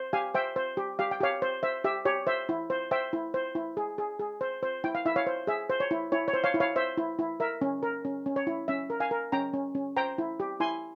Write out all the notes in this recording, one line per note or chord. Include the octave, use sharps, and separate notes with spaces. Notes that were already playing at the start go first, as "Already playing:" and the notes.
Already playing: C5
G4 F5 G#5
C5 E5 G5
C5
G4
G4 F5
G5
G4 C#5 F5
C5
C5 E5
G4 E5
G4 C#5
C5 E5
E4
C5
C5 E5 G5
E4
C5
E4
G#4
G#4
G#4
C5
C5
E4 G5
F5
E4 E5
C#5 F5
C5
G#4 E5
C5
C#5
E4
E4 C#5
C#5
C5
C#5 F5
E4
C#5 F5
C5 E5
E4
E4
A#4 E5
C#4
A#4
C#4
C#4
C#5
E4
C#4 E5
A#4
F5 G#5
A#4
C#4 G5 A#5
C#4
C#4
C5 G5 A#5
E4
G4
E4 G#5 C6